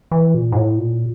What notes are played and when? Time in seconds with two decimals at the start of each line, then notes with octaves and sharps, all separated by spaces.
0.11 E3
0.35 A#2
0.52 G#2
0.56 A2
0.79 A#2